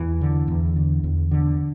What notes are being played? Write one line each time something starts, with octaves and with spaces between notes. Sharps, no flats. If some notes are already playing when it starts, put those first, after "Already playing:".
Already playing: E2 E3
D3
E2
D3
E2
D3